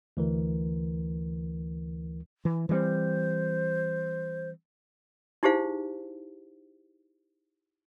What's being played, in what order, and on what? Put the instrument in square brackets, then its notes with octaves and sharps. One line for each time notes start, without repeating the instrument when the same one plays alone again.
[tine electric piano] D2 E3 A#4
[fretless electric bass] E3
[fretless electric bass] E3 G3 C4 [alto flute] C5
[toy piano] D#4 E4 G4 G#4 C5 F5